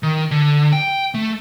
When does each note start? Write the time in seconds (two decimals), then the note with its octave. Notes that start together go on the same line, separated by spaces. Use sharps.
0.03 D#3
0.31 D3
0.73 G5
1.14 A3